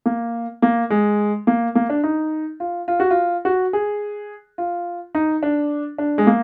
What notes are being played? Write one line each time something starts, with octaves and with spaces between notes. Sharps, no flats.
A#3
A#3
G#3
A#3
A#3
D4
D#4
F4
F4
F#4
F4
F#4
G#4
F4
D#4
D4
D4
G#3
A#3